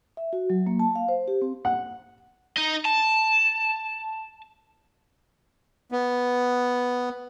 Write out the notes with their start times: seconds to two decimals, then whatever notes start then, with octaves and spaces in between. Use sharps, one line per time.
0.17 E5
0.33 F#4
0.50 F#3
0.67 A#3
0.79 A5
0.95 F5
1.09 C5
1.28 G4
1.42 C4
1.65 F#5
2.57 D#4 D#5
2.85 A5
5.92 B3